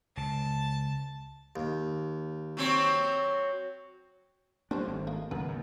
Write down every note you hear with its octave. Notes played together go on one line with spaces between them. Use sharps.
C#2 C#3 A5
D#2
F#3 C4 C#5
G3 A3 C#4 D4 G4 C5
G#1
F3 A#3 B3
D#2 C#3 F#3 A#3 B4
G#2